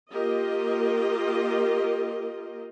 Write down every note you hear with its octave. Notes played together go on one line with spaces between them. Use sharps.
A#3 F4 G4 A#4 D#5